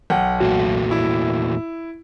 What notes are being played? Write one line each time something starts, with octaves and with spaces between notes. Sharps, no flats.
B1 F#5 G5
E2 A#2 A3 F#4
E4